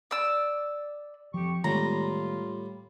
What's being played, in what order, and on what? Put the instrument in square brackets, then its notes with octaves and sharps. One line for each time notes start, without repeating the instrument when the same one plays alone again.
[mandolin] D5 E6
[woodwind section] F2 G4 C#6 [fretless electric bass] F3
[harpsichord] A2 G3 [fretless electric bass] D#3 G#3 B3 [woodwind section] F4 [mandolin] A#5